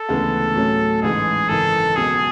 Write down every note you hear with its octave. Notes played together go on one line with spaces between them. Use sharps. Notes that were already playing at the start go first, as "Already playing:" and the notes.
Already playing: A4
D2 C#3 E3 G#3 B3
A2 F#3 A3 C#4
A1 G#2 E3 G#3 G#4
G#1 F#2 C#3 E3 A4
C#2 B2 F#3 G#4